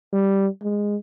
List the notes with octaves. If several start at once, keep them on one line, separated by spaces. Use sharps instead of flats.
G3
G#3